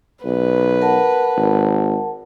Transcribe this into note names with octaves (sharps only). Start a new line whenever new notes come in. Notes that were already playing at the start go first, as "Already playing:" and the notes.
B1 B4
A#4 F#5 A5
G#1